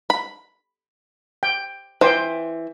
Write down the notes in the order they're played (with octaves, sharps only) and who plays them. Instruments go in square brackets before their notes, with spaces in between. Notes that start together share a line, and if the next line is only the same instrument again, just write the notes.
[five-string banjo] B5
[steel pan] G5
[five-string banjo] E3 [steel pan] C5 G5